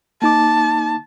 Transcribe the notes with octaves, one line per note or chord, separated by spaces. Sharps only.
A#3 D#4 A5 D6